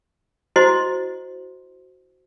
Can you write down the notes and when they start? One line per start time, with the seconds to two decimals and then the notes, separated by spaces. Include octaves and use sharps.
0.56 E4 F#4 C5 D#5 C6